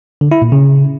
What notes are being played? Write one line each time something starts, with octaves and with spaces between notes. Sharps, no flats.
D3
E4
A#2
C#3